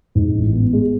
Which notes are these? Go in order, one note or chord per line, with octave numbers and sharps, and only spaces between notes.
G#2
A1
B3
G#3